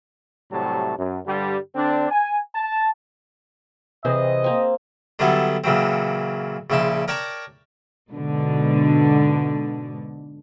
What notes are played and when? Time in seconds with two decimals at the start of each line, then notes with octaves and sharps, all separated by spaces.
0.52 A2 C3 F#3 G3 A5
0.98 F#2
1.26 G2 D3 G3
1.76 D3 C4 D4
2.11 G#5
2.55 A5
4.05 C3 E3 C4 G#4 B4 C5 D#5
4.44 A#3 C4
5.19 D3 F#3 G3 B3 E4 A4
5.64 A#2 C#3 E3 F#3 C4
6.70 A#1 C#3 E4 G5 A5 C6
7.08 A#4 C#5 D5 G5 A5 A#5
8.10 G#2 B2 D3